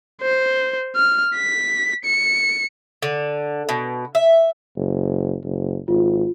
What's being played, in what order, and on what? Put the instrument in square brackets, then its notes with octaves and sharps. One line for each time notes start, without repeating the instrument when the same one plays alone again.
[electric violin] C5
F6
B6
C#7
[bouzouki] D3
B2
E5
[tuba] F#1
F#1
[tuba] G#1 [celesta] F4